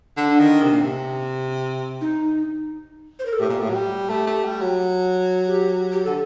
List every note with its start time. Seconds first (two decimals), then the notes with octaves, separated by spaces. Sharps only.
0.17 D3
0.28 D4
0.40 D#3
0.63 C3
0.72 A#2
0.81 C3
2.01 D#4
3.19 C5
3.26 A#4
3.33 A4
3.40 A2 G4
3.49 A#2
3.60 A2
3.70 F#3
3.74 G3
4.09 A3 G4
4.27 A3
4.45 G3
4.61 F#3
5.48 G4
5.92 G4
6.04 D3 A4